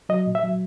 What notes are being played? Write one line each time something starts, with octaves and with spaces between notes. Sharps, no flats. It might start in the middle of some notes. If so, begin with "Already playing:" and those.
F#3 D#5
A#2
E5
F#3